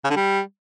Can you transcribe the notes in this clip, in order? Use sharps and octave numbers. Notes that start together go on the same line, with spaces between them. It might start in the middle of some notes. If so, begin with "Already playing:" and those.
C#3
D3
G3